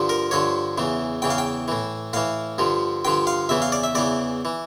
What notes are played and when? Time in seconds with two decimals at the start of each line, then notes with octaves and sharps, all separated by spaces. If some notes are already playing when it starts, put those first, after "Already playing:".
Already playing: G2 D3 F3
0.09 A#4
0.31 G2 D3 F3 C#5
0.78 E2 C#3 E3
1.22 E2 C#3 E3 G5
1.30 F5
1.38 G5
1.68 A2 E3
2.13 A2 E3 F5
2.58 G2 D3 F3
3.05 G2 D3 F3 G5
3.27 F5
3.49 E2 C#3 E3 E5
3.62 F5
3.72 D5
3.84 E5
3.95 E2 C#3 E3 D5
4.45 E3